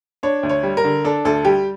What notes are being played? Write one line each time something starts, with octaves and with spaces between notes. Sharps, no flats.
D4 C#5
D2
C#5
G3
A#4
D3
D4 A4
D2 A4
G3 G4